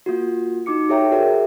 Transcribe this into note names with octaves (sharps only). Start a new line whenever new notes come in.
A#3 F4 F#4
D#4 F#4 D6 C#7
G4 A4 C#5 E5 G5 A#5
F#4 G#4 A#4 D5 E5